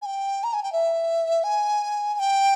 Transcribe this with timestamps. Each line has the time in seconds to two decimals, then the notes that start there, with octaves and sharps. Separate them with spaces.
0.02 G#5
0.06 G5
0.44 A#5
0.53 G#5
0.63 G5
0.73 E5
1.44 G#5
2.15 G#5
2.19 G5